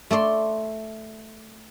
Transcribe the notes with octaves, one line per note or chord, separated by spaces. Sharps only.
A3 A4 D5 C6